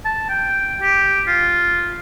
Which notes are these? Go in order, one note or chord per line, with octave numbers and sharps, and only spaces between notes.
A5
G5
G4
F4